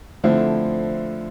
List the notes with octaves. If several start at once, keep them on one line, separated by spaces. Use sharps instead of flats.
D3 F3 A3 C4 E4